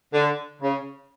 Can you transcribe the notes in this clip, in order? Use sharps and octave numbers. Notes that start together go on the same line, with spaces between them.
D3
C#3